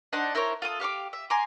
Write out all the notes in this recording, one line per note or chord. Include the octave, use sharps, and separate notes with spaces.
D4 D#4 C5 F#5
E4 A#4 C5 C#5
F4 A4 D#6
G4 F5 C#6 D6
E5
G#5 A#5 C6 D6